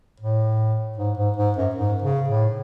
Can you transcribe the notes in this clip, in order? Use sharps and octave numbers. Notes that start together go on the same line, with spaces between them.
A2
G#2
G#2
G#2
F#2
G#2
C#3
A2